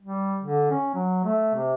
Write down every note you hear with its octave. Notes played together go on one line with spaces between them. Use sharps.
G3
D3
C#4
F#3
A3
C3